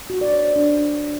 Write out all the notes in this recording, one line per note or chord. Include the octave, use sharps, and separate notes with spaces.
F#4
D5
C#5
C5
D4